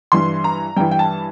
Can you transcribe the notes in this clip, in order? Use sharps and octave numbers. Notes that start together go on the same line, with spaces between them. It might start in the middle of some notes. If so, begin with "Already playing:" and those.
G2 E3 C6
A#5
G2 E3 G5
G5
A5